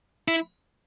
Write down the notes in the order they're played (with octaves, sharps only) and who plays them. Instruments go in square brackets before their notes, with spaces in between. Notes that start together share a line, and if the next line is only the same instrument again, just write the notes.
[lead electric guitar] E4